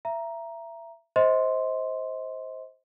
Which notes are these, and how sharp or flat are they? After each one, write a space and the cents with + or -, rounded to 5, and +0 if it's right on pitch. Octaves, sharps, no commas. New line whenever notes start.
E5 +25 A#5 +5
C5 +0 D#5 +35 C6 +0